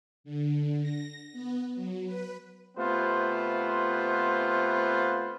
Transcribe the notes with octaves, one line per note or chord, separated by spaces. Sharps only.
D3
A#6
B3
F#3
B4
C3 A3 B3 F4 C5